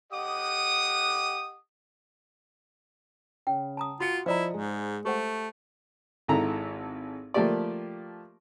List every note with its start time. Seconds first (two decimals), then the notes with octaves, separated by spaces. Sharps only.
0.12 G4 D#5 F#5 D#6
3.47 C#3 G5
3.77 A5 A#5 D#6
4.00 F4 F#4 C6 C#7
4.26 F3 E4 C5 D5 D#5 A#5
4.54 G#2 G#3
5.05 A3 G4 C5 F#5
6.28 G#1 G#2 E4 A4 A#5
7.34 F3 A3 A#3 F4 G4 D5